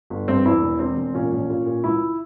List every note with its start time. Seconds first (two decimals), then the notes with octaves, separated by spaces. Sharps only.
0.10 G1
0.28 G2 C4
0.45 E2 E4
0.62 E1
0.79 E1 C4
0.97 E1
1.14 A#2 C#4
1.32 A#1
1.49 A#2
1.66 A#2
1.84 C#2 E4